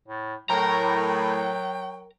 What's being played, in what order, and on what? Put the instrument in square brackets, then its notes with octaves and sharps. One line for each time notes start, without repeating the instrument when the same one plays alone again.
[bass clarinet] A2
[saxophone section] A2 [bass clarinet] F#3 [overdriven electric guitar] A#4 A#5 [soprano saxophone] G5